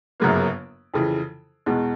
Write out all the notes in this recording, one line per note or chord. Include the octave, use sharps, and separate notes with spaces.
G1 F#2 C#3 F#3 A#3
F2 C#3 E3
E2 B2 G#3